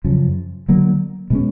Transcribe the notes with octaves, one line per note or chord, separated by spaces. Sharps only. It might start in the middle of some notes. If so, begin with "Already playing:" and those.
F#2 C#3 F3
D3 F#3 A#3
B2 G#3 C#4